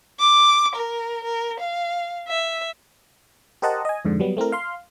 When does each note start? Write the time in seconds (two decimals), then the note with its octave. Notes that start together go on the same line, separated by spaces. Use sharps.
0.20 D6
0.75 A#4
1.24 A#4
1.60 F5
2.28 E5
3.62 G4 A#4 C5 D#5 F#5 A5
3.85 D#5 G#5
4.05 F2 G#2 D3
4.20 F#3 G3 B3
4.37 A3 C4 E4 A#4
4.52 F5 C6